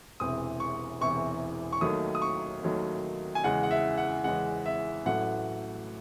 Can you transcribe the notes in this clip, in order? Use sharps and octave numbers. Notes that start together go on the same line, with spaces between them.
E1 E2 C3 E3 D#6
C#6
E1 E2 C3 E3 C#6
C#6
D#2 D#3 F#3 A3 D#6
D#6
C#6
D#2 D#3 F#3 A3
G#5
E2 C#3 G#3 F#5
F#5
E5
F#5
E2 C#3 G#3 F#5
E5
A1 A2 F#3 A3 F#5